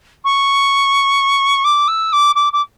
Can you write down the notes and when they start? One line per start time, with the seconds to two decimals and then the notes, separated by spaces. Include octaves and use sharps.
0.25 C#6
1.64 D6
1.88 E6
2.13 D6
2.35 D6
2.53 D6